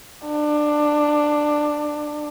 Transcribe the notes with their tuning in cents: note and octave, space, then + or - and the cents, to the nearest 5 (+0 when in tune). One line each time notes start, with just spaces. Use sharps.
D4 +15